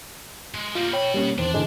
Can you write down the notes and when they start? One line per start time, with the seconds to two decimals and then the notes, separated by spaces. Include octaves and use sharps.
0.54 G#3
0.75 G3 A#3 F4
0.93 B2 C#5 G5 B5
1.14 G3 A#3 C#4
1.38 E2 D#3 C4 D4
1.54 G#2 D3 E3 G#3